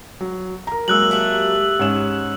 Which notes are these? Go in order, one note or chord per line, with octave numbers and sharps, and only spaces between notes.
F#3
A#4 A#5
F#3 G#3 A#3 E6 F#6 F#7
A3 G4
G#2 C#4 E7